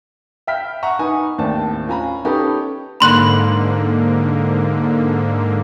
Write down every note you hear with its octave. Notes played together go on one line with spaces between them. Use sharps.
E5 F5 G5 B5 F6 B6
E5 F#5 A#5 C#6
D#4 B4 G#5 C#6
D#2 A2 C4 D5 A5
C#4 F4 G#5 A#5 B5
C#4 D#4 G4 A4 B4
G#2 D3 A#3 B5 C6 F#6